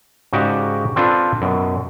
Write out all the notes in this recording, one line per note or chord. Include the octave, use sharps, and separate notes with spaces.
G#2 C#3 D#4 F#4 G4 D5
C4 D4 F4 A4 B4
F#2 B2